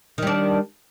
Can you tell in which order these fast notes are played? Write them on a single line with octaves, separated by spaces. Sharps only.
D#3 G3 D4